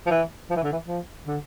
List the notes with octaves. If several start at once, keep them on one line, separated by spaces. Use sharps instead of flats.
F3
E3
F3
E3
D3
E3
F3
D3